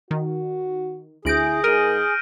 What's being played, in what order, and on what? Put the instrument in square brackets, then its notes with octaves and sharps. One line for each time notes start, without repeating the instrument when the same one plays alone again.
[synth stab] D#3 [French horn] F#4
[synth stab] D2 D7 [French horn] E4 [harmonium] G#4 [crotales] G6 A#6 F#7
[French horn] G#2 [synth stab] A#4 [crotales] F6 D7 D#7